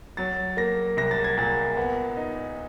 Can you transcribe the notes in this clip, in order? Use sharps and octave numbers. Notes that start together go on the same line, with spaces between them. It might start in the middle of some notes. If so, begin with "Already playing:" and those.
F#3 A6
A#3 A#6
C2 A#6
A6
G#6
A#2 A6
B3
D#4